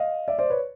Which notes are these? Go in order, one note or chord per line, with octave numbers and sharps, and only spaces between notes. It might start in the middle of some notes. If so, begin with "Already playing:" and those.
Already playing: D#5 F5
D5 E5
C5 D5
B4 C#5